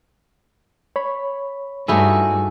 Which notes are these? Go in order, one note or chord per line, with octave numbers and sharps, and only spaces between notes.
C#5 B5
G2 A3 D#4 E4 F#4 G#4